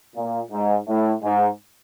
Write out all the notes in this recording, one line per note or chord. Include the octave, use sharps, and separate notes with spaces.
A#2
G#2
A2
G#2